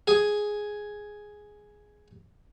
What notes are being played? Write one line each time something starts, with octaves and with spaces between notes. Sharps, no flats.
G#4 G#5